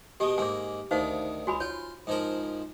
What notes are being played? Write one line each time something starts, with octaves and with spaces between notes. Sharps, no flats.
B2 G#3 G4
G#2 A#3 G#5 D6
D2 D#3 D#4 C5 F5
C#2 F#4 G#5 B5
F4 C#5
G#2 F3 A#4